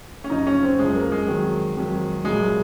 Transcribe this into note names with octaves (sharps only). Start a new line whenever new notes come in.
C#4
F#2 C#3 F3 D#4
C#4
C4
F#2 C#3 F3 G#3
A#3
G#3
F2 D#3 F#3
F2 D#3 F#3
C2 A#2 F#3 G#3